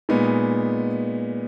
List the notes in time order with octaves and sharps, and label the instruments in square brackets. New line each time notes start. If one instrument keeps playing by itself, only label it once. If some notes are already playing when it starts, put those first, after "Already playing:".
[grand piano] A#2 G#3 B3 D#4